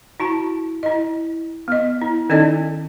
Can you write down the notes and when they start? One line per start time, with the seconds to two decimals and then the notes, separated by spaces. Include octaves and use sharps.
0.20 E4 F#4 A5
0.83 E4 D#5
1.68 B3 D#5
2.02 E4
2.29 D#3 C#4 D#4 A4 D5 D#5